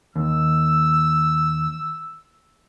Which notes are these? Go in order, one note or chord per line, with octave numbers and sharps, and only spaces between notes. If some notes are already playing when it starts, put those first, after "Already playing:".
D#2 E6